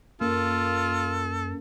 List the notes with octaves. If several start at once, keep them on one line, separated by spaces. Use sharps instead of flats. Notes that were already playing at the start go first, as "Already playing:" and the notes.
F#2 A#3 F4 A4